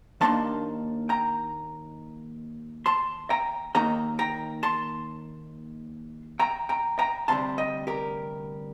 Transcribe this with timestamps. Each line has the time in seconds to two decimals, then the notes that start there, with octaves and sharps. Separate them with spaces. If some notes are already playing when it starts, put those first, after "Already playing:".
0.21 D#2 D#3 A#3 D4 A5 C6
1.09 G5 A#5
2.86 A5 C6
3.30 G5 A#5
3.75 D#2 D#3 A#3 D#4 G5 A#5
4.19 G5 A#5
4.63 A5 C6
6.39 G5 A#5
6.69 G5 A#5
6.99 G5 A#5
7.28 D2 C3 G3 A5 C6
7.58 D#5 G5
7.87 G4 A#4